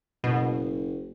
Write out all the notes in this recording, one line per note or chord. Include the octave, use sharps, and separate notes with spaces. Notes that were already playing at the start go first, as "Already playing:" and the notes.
F#1 B2